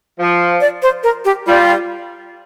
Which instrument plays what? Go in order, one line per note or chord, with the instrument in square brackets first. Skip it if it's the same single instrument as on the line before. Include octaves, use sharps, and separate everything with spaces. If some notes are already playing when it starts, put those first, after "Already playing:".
[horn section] F3
[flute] D5
C5
A#4
G4
[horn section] G3 [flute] F4